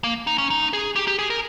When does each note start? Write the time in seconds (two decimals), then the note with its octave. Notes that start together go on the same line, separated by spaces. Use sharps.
0.04 A#3
0.27 D#4
0.38 C#4
0.50 D#4
0.73 G#4
0.96 G4
1.07 G4
1.19 G#4
1.30 A#4